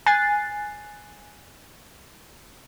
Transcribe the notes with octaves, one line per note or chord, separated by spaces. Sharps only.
G#5 F#6 A6 C7